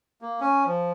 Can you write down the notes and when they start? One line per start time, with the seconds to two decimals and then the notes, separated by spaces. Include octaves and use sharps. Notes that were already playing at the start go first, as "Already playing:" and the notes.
0.22 A#3
0.41 C#4
0.66 F3